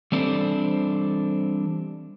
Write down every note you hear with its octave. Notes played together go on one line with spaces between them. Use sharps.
E3 G3 C4 D4 A4 C5